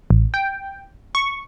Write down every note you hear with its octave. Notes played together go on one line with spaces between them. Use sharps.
A1
G5
C#6